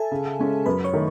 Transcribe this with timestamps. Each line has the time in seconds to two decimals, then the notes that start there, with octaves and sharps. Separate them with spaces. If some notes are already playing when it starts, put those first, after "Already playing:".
Already playing: A4 E5 G#5 A5
0.11 C#3
0.39 G#3 C#4
0.66 F#2 B4 B5
0.84 C#5 C#6
0.94 D#3 A3